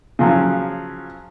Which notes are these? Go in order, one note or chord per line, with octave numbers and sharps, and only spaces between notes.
C#3 F3 F#3